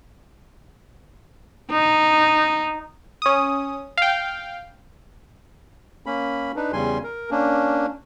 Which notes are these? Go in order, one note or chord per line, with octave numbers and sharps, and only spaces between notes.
D#4
C#4 D#6
F5 G5
A#3 C#4 B5
D4 D#4 B4
E2 C#3 G3 G#5 C6
A#4
A#3 C#4 D4